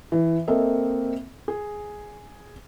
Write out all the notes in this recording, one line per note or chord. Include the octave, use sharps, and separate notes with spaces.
E3
A#3 C4 A4 D#5 E5
G#4